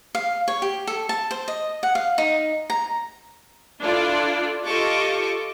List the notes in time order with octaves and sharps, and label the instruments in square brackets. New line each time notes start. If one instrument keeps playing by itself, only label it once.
[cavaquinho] F5
C#5
G4
A4
A5
C5
D#5
F#5
F5
D#4
A#5
[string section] D4 E4 F4 A4 D5
F4 G4 A4 D#5 C#6 D6